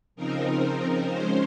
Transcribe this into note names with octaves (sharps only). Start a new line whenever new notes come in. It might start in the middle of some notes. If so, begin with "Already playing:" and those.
C#3 F3 C4 D#4 A#4
F3 G#3 C#4 C5